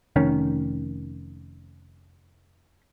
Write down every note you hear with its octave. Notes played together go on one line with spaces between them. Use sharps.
F1 D#3 C#4